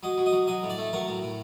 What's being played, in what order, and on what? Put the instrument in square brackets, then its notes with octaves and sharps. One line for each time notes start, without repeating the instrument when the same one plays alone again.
[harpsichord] F#3 D#5
F#3
D#5
F#3
F#3 D#5
A2
D5
A3
F#3 A#4
A2
A2